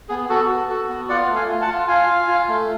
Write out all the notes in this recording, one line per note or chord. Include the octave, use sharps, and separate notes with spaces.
B3 G#4
B3 F#4 A4
F#4
F#4 A4
B3
F4 D5 F#5
A3
F5 G#5
F4
F#5 A5
F4
F4 F5 G#5
F4
F4
A3